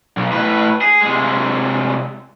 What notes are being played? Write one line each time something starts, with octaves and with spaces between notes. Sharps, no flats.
B1
A2 B4
G#4
C3 G#3